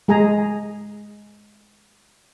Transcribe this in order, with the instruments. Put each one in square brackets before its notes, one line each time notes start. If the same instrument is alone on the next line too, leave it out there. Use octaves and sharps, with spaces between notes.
[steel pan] G#3 G#4 G#5 A#5